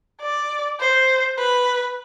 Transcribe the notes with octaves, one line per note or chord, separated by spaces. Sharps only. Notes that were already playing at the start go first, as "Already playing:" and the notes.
D5
C5
B4